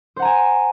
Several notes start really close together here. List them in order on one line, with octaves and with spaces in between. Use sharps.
C5 F#5 A#5 G#5